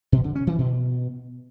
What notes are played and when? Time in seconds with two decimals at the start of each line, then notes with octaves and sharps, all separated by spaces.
0.12 B2
0.24 D3
0.35 C#4
0.47 E3
0.59 B2